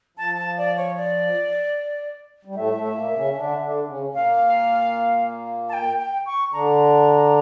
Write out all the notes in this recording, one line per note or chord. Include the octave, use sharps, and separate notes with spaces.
F3 A5
A5
D5
C#5
D5
G3
A2 A3 E5
A2 A3
A#2 A#3
C#3 C#4
D3 D4
D3 D4
C#3 C#4
C#4
A#2 A#3 F5
A5
G5
G5
C#6
D3 D4 A#5